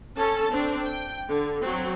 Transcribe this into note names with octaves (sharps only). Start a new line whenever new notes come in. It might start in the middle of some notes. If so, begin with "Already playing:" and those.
C#4 A4 A5
C4 D4
G5
D3
F#3 C4